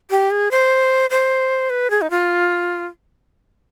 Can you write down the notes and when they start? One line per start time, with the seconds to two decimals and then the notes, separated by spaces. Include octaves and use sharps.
0.11 G4
0.31 G#4
0.51 C5
1.10 C5
1.70 B4
1.90 G#4
2.02 D#4
2.10 F4